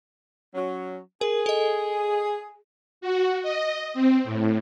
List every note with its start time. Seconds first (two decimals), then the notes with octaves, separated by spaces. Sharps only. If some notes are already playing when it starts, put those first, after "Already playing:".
0.54 F#3 C#4
1.21 G#4 A#4
1.46 A4 D#5
3.01 F#4
3.43 D#5
3.94 C4
4.24 A2